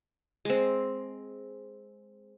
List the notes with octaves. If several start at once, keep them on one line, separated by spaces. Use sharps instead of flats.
G#3 C4